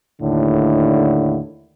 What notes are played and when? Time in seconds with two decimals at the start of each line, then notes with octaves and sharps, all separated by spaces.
0.21 D#2 A2 D3